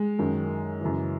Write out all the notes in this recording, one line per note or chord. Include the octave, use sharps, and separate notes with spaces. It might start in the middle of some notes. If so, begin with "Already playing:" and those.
Already playing: G#3
F#2 D#3
F#2 C#3 E3